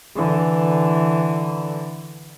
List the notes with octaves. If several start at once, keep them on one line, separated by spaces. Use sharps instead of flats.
D3 E3